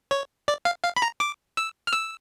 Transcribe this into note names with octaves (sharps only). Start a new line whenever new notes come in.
C#5
D5
F5
F5
B5
A#5
D6
E6
F6
E6